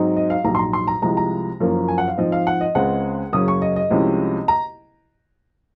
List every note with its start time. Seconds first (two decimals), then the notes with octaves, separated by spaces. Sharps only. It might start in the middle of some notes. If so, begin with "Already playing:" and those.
Already playing: G#2 F#3 C4 D#4
0.16 D#5
0.30 F5
0.45 A#1 G#2 F#3 A#5
0.55 C6
0.59 A#5
0.73 C6
0.87 A#5
1.02 C2 C3 F3 G#3 A#5
1.17 A#5
1.60 F#1 F#2 F3 A#3 C#4
1.88 G#5
1.98 F#5
2.08 F5
2.18 G#2 F3 C4 D#5
2.32 F5
2.47 F#5
2.61 D#5
2.75 C#2 C#3 G#3 C4 F#5
3.33 F#1 F#2 C#3 F#3 C#4 D#6
3.48 C#6
3.62 D#5
3.76 D#5
3.90 C2 C3 F3 G#3 C#4
4.48 A#5